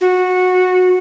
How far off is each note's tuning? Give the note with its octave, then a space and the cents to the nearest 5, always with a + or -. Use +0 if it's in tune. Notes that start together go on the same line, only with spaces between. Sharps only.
F#4 -15